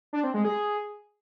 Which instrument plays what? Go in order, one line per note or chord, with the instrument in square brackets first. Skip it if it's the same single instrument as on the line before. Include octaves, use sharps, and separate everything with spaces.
[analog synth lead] D4
C4
G#3
G#4